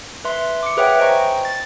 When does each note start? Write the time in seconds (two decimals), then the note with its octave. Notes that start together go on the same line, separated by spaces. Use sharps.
0.25 B4 E5 C6
0.63 D6 C#7
0.77 G#4 B4 C#5 E5 F#5 G5
0.98 C5 D#5 G5 G#5 A#5 C#6
1.45 A6